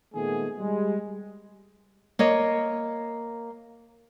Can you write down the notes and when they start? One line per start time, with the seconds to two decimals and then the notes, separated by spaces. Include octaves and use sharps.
0.14 A#2 D#3 G#3 A3 B3 G#4
0.59 G3 G#3
2.19 A#3 C#5 D#5